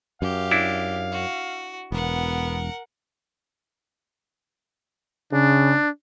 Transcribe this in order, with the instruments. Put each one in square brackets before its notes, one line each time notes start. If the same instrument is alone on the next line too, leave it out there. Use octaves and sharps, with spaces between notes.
[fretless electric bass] F#2 [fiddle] G4 [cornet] F5
[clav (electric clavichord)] D4 E4
[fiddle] F#4
[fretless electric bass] E1 [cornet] B3 [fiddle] A#4 F#5
[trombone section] C#3 [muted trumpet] D4